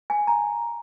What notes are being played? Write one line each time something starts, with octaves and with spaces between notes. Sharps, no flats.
G#5
A#5